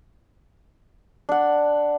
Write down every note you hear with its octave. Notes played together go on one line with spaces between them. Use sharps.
D4 F#5